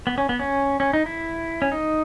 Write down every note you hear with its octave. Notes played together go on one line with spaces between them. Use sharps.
B3
C#4
B3
C#4
C#4
D#4
E4
C#4
D#4